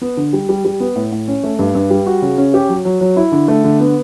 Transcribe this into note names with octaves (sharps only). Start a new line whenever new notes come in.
B3
D3
G3
G3
G3
B3
A2
A2
C#4
A3
G2
G2
G3
F#4
C#3
C#4
G4
F#3
F#3
F#3
E4
D3
A3
D3
B3